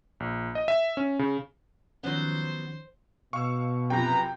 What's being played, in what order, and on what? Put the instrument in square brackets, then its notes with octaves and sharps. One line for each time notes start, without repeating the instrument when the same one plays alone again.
[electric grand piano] A#1
D#5
E5
C#4
C#3
[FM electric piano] D#3 F3 C#4 [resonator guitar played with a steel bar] F#3 B3 [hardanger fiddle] C5
[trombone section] B2 [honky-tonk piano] F5 E6 [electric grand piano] C#6
[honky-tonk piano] F#2 C3 F3 [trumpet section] B4 A#5 [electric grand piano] G5